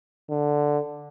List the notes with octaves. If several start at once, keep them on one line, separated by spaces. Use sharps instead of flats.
D3